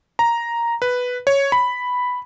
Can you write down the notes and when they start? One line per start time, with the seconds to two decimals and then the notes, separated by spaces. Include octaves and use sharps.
0.19 A#5
0.82 B4
1.27 C#5
1.52 B5